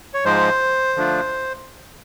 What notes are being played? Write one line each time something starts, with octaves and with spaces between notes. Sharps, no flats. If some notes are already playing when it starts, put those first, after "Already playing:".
C#5
G#2 F3 G#3 C5
D3 F3 A3 D4 F4